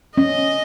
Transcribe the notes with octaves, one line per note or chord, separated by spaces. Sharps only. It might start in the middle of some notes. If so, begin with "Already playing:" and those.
C#4 D#5